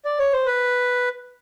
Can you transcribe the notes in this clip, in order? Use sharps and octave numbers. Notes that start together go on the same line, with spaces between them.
D5
C#5
C5
B4